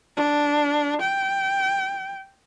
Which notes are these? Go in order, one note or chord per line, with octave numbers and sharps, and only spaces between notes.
D4
G5